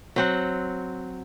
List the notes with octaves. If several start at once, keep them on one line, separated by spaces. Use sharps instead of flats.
F#3 C4 F#5